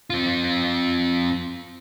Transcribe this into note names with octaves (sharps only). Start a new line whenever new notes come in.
C4 F4